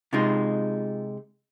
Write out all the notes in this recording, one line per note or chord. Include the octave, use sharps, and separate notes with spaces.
C3 G#3 D#4 F4